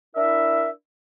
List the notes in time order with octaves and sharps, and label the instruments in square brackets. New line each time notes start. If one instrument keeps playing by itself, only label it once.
[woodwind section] D4 E4 A#4 E5